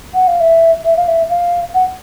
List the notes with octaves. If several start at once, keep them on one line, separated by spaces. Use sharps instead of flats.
F#5
F5
E5
E5
F5
E5
F5
F#5